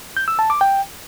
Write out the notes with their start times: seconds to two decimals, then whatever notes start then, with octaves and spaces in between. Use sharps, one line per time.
0.17 G6
0.28 E6
0.39 A5
0.50 D6
0.61 G5